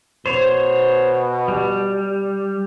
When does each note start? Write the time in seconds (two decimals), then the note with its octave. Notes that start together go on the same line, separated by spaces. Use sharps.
0.26 B2 C5 C#5
1.48 G3